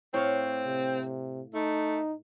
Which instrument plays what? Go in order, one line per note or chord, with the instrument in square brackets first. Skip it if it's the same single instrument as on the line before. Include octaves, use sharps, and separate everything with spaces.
[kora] A2 C#5 F5 [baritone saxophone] C4
[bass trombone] C3
[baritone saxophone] A3 [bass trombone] D#4